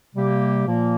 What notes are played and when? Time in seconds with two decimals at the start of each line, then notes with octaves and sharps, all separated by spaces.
0.15 C3 G3 A#3 G4
0.67 A#2 F3 A#3